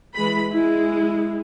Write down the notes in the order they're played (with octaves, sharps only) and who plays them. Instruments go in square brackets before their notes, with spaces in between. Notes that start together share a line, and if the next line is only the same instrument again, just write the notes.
[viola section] E3 G#3 B5
[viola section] G#3 [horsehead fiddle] E4